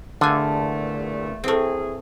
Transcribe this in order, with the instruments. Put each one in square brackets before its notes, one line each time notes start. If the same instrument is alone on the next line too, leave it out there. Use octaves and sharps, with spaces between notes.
[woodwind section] E2 A#2 A3 [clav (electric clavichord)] D3 [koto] F4 G#5
[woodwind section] E3 G#4 [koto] A3 C4